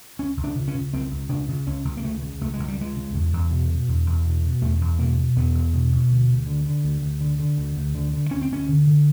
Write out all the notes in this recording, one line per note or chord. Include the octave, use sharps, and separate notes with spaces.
C#2 C#4
C#2
D4
C#3
C#4
C#3
C#2 C4
C#2
C#3 D4
C#3
C#2 C#4
C#2
A#3
C#3 A3
C#3
C#2 A3
G#3
C#2
G3
C#3 G#3
C#3
E2
E2
B2
B2
E2
E2
B2
B2
E2 A3
E2
B2 A#3
B2
E2 B3
E2
B2
B2
D2
D2
D3
D3
D2
D2
D3
D3
D2
D2
D3
D3
D2 C#4
C4
D2 C#4
D3
D3